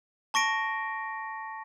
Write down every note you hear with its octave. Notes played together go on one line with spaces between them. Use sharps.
A5 C#6 A#6 D7